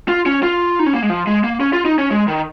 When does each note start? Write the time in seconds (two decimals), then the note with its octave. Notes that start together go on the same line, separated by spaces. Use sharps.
0.08 F4
0.26 C#4
0.43 F4
0.79 D#4
0.86 C#4
0.94 A#3
1.02 G#3
1.10 F3
1.27 G#3
1.44 A#3
1.60 C#4
1.73 F4
1.85 D#4
1.99 C#4
2.11 G#3
2.28 D#3